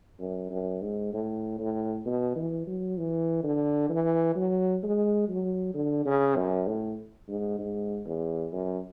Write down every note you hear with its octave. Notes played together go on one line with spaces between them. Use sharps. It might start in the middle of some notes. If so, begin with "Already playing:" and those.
F#2
F#2
G#2
A2
A2
B2
E3
F#3
E3
D3
E3
F#3
G#3
F#3
D3
C#3
F#2
A2
G#2
G#2
E2
F#2